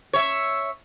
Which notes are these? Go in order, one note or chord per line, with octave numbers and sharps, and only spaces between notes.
C#5 E5